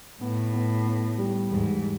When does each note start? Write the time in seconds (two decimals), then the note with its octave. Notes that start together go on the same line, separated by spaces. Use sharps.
0.21 A2 B3
0.53 B3
0.86 B3
1.18 G3
1.50 E2 G#2